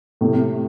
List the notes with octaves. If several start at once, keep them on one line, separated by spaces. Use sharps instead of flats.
A2 C3